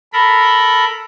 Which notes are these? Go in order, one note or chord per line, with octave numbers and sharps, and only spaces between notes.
A4 A#4 B5